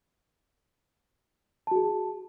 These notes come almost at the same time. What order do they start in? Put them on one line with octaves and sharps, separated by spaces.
A5 F#4 G#4